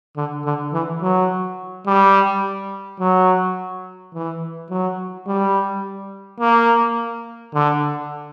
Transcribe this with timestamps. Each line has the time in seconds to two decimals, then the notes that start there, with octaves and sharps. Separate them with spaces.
0.16 D3
0.45 D3
0.73 E3
1.02 F#3
1.86 G3
3.00 F#3
4.14 E3
4.70 F#3
5.27 G3
6.40 A#3
7.54 D3